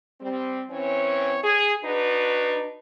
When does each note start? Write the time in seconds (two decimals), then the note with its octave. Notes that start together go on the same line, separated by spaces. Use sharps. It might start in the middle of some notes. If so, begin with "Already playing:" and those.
0.21 G3 C4
0.70 E3 C4 C#4 C#5
1.44 G#4
1.85 D4 D#4 F#4 B4